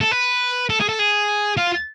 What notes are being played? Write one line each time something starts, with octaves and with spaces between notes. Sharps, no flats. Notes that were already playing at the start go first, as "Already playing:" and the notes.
A4
B4
A4
G#4
A4
G#4
F4